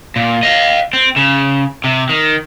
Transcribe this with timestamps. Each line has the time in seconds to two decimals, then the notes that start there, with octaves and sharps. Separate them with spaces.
0.16 A#2
0.43 D#5 F5
0.93 C4
1.16 C#3
1.84 C3
2.09 D#3